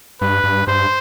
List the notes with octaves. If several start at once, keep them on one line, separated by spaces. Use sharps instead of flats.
G2 B4
G2
G2 C5